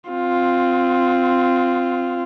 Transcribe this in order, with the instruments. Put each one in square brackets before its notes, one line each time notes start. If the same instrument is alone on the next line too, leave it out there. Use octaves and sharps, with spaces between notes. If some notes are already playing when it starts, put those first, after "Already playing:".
[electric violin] C4 F4